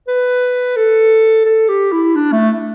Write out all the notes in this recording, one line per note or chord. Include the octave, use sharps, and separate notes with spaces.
B4
A4
A4
G4
E4
D4
A3